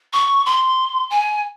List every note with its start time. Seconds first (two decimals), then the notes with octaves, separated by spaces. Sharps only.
0.13 C#6
0.46 C6
1.10 G#5